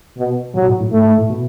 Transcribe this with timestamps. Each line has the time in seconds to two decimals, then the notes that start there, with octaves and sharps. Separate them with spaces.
0.17 B2
0.55 B2 F#3
0.67 A2
0.80 A2
0.92 G#2 A3
1.05 G#2
1.18 A2
1.29 B2